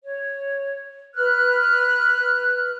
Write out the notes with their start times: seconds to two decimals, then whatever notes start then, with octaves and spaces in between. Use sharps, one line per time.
0.03 C#5
1.15 B4 F6 F#6